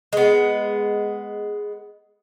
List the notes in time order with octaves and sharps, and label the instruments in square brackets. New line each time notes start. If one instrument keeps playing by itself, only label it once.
[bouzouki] G#3 B3